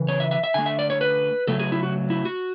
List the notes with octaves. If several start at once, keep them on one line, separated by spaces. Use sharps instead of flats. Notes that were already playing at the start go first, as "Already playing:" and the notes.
Already playing: C#3 E3
C#5
E5
E5
E5
D3 A3 G#5
E5
D5
C#5
B4
C#3 F#3 A3 A4
G#4
E4
F#4
E4
F#4